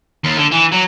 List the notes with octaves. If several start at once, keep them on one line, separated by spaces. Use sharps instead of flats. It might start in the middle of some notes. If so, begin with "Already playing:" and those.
D#2
D3
E3
F#3